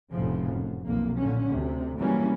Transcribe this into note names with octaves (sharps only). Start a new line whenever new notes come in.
F1 F2 A2 C#3 F3
F#2
B1 F2 A#3
A#2 D3 C#4
D2 C3
C3 E3 F#3 G3 A#3 C#4